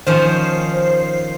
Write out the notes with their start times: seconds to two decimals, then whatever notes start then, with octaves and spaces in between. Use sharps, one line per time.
0.07 D#3 F3 C#4 C5